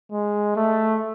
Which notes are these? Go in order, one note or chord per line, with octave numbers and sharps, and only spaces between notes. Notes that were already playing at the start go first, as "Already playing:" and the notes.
G#3
A3